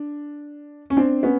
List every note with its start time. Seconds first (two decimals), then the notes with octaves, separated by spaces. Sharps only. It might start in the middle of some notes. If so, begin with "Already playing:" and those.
Already playing: D4
0.90 C#4
0.97 C4 D4
1.23 B3 C#4